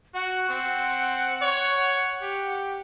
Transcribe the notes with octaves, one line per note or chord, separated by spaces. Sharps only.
F#4 F#5
C4
C#5
G4